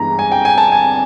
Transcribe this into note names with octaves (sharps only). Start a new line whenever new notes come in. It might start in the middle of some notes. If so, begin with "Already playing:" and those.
Already playing: G2 E3 G#3 B3 A#5
G#5
G5
G#5
A5
G#5